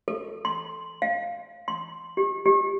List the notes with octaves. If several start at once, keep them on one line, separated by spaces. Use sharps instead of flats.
A4
C6
F5
C6
G4
G4